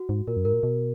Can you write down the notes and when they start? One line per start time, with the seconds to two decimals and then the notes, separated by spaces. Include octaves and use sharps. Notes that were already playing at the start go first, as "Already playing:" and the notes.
Already playing: F#4
0.09 G#2
0.27 A#2 A#4
0.37 F#2
0.45 G#2 A#4
0.53 A#2
0.63 B2